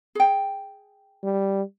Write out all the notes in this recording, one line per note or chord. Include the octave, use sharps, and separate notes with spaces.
G#4 G5
G3